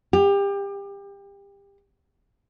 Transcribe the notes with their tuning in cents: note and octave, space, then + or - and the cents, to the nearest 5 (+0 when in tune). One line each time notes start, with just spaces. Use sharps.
G4 +30